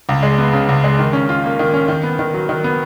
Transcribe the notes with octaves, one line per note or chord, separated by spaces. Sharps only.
C#2
G#3
B3
C#3
C#2
G#3
D#3
C#4
F4
A#3
D#3
C#4
D#3
B3
D#3
F#3
D#3
B3